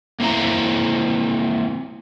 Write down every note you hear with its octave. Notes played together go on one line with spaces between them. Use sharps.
A#3 C4 E4 A#5